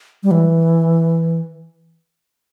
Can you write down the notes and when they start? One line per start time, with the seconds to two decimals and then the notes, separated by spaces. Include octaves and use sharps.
0.23 G3
0.31 E3